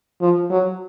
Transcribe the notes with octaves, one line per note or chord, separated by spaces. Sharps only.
F3
F#3